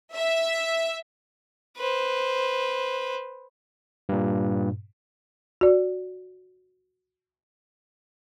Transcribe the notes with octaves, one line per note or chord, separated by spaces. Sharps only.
E5
B4 C5
G2 A#2
F#4 D5